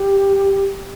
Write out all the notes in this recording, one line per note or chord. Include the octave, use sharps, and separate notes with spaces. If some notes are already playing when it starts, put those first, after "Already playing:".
Already playing: G4